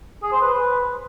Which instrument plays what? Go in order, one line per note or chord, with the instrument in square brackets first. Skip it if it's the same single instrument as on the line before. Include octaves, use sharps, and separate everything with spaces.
[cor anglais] G#4
C5
B4